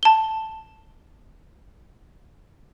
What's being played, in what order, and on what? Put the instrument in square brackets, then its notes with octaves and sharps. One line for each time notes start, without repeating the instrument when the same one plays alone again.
[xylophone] A5 G7